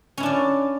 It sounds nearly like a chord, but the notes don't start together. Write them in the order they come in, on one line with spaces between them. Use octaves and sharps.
C#4 E4 D4 D5